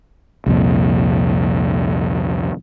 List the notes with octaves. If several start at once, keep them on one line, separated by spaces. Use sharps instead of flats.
C2 F2 A#2